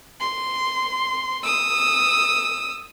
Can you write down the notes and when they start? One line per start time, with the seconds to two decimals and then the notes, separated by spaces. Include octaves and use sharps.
0.20 C6
1.43 D#6 E6